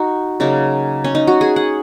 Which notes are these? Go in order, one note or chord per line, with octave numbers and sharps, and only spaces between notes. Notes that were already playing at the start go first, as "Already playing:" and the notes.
Already playing: D#4 F#4
C#3 F#3 A#3 D#4
C#4
D#4
F#4
G#4
F#5